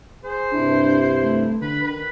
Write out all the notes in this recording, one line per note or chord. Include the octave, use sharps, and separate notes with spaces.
G#4 C5
G2 C3 D4 E4
A3
D3 B4
D#3 B4